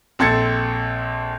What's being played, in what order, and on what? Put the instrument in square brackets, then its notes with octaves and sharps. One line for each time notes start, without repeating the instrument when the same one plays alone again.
[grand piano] A#1 C4 A4 G#6 A6 C#7